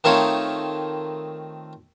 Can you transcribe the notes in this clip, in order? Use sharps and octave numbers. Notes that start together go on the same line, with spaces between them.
D#3 A3 C4 D#4 F4 C#5